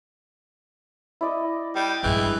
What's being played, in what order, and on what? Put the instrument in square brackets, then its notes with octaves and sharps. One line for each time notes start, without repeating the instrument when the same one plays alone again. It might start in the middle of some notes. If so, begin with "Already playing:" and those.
[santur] E4 D5 D#5
[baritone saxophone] G3 [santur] D#5 [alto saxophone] G5
[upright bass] A#1 G2 [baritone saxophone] E3 [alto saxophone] G#3